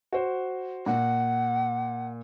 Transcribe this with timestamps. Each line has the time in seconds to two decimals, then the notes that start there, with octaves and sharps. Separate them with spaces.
0.12 F#4 C5
0.86 A#2 F#5